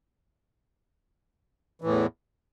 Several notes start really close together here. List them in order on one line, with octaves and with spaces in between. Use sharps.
E3 A2 E2